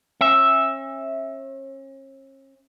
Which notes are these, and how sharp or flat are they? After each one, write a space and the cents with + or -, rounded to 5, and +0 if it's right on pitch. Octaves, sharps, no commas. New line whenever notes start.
C#4 -40 E5 +0